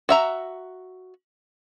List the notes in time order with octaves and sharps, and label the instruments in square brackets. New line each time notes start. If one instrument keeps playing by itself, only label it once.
[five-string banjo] F#4 E5 A#5